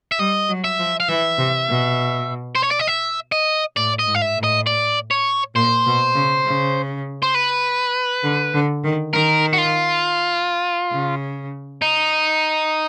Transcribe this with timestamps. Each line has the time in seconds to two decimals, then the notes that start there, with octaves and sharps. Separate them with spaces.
0.12 E5
0.19 G3 D#5
0.49 F#3
0.64 E5
0.79 F3
1.00 F5
1.09 E3 E5
1.38 C3
1.69 B2
2.55 C5
2.63 C#5
2.71 D5
2.79 D#5
2.88 E5
3.32 D#5
3.76 A2 D5
3.99 D#5
4.07 G#2
4.15 F5
4.22 E5
4.37 A2
4.44 D#5
4.67 D5
5.11 C#5
5.55 A#2 C5
5.86 B2
6.15 C#3
6.45 C#3
7.23 C5
7.35 B4
8.24 D3
8.54 D3
8.84 D#3
9.13 D#3 A#4
9.53 F#4
9.58 F4
10.92 C#3
11.82 D#4